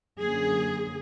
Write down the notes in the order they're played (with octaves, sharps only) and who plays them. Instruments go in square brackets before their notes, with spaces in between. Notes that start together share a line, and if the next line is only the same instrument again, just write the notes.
[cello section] F#2 D3 F#3 A#3 C#4 G#4